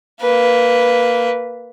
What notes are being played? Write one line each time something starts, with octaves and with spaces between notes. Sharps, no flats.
A#3 B4